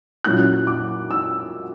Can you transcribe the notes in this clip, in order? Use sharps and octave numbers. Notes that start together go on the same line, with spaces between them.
A#2 F#3 C#4 E4 F#6
D6
E6